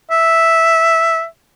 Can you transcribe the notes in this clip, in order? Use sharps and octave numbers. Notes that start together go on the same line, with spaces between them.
E5